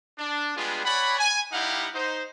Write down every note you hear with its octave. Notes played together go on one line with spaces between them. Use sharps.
D4
G3 G#3 B3 D4 F4 G#4
C#5 D5 F#5 G#5 B5
G#5
G3 D#4 E4 G4 F5 F#5
D#4 C5